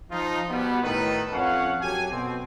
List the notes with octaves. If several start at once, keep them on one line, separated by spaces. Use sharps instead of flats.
F3 D#4 F4
B2 G3 B3
A2 D#3 A4 B4
F2 C#4 F5 F#5
F#2 F#3 G4 A4 G#5
B2 C4